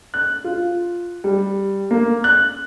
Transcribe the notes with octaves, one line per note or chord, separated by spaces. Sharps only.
F#6
F4
G3
A#3
F#6